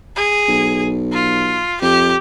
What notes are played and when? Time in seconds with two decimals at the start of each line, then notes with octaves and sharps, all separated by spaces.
0.16 G#4
0.48 B1
1.13 F4
1.82 F2 G4